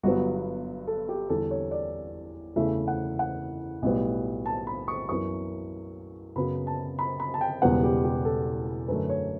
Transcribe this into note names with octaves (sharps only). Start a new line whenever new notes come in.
G1 G2 F#3 B3 F#4
A4
G4
E2 D3 G3 A4
C#5
D5
E2 C#3 E3 A3 E5
F#5
F#5
B1 A2 G3 B3
A5
B5
C#6
F#2 E3 B3 C#6
F#2 C#3 F#3 B3 B5
A5
B5
B5
A5
G5
E1 E2 C#3 G3 B3 F#5
G4
G4
A4
F#2 D3 A3 B4
C#5